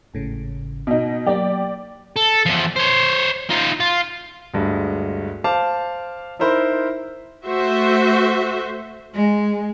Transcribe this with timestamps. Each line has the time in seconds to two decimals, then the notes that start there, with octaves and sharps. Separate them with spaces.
0.14 G#1 A2 C#3
0.87 B2 D#4
1.26 F#3 A#3 G4 D5
2.16 A4
2.46 E2 F3
2.76 C5 C#5
3.50 D#4 F4
3.80 F4
4.54 D2 G2 G#3
5.44 C5 F5 A5 D6
6.39 D#4 E4 A#4 C5 B5 C6
7.45 A3 F#4 C5 E5
9.14 G#3